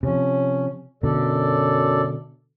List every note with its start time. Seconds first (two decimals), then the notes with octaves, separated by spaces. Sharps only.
0.03 C3 F3 C#4
1.03 F#2 B2 D3 A4 D5